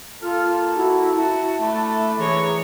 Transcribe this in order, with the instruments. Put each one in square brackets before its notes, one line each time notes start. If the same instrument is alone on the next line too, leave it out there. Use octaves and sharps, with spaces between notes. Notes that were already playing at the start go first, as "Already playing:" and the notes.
[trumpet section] A#3 A4 [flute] F4 [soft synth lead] F6
[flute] E4 [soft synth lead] F#4
[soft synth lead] E4 [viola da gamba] F#4 [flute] A5
[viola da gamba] A3 [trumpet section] D4 B5
[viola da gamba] E3 C#5 [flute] G#4 [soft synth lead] A#5